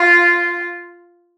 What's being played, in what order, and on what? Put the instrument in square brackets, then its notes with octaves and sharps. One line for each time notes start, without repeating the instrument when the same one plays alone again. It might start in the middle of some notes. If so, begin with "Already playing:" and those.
Already playing: [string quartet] F4